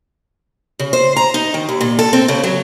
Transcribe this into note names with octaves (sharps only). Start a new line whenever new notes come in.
C#3
C5
A#5
D#4
D#3
D#2
A#2
A4
C4
C#3
F#3